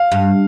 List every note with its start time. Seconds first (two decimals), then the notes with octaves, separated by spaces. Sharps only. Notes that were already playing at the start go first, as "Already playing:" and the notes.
Already playing: F5
0.12 G2